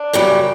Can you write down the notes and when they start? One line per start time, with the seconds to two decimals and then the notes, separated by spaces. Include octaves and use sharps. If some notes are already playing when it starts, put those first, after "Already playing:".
Already playing: D4
0.13 F#2 C#3 G3